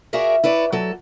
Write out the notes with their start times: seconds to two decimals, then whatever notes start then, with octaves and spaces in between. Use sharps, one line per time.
0.13 F#4 G#4 A#4 D5 E5 F5
0.44 E4 B4 C#5 D5
0.72 F#3 A4